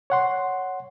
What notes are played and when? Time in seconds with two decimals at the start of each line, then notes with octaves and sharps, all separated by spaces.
0.10 C#5 F#5 C6